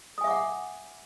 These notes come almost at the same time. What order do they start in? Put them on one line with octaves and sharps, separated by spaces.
D#6 G#5 E5 D6 F#5